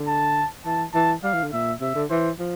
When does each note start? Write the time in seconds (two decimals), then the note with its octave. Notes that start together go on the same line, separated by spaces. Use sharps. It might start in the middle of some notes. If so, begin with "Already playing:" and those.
Already playing: D3
0.08 A5
0.66 E3 A5
0.94 E3 A5
1.24 G3 F5
1.34 E3
1.43 D3
1.53 A#2 E5
1.81 C3 E5
1.95 D3
2.10 E3 C5
2.39 F3